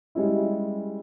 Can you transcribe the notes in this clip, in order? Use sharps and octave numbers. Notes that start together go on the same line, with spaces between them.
G3 G#3 C#4 E4